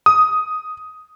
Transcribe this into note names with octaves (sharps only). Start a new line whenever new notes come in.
D#6